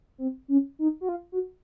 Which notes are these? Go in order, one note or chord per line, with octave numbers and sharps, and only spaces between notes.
C4
C#4
D#4
F#4
F4
F#4